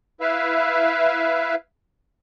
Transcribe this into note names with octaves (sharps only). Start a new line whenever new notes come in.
E4 B4 E5 F5